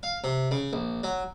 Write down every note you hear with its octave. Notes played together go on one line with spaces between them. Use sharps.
F5
C3
C#3
A#1
F#3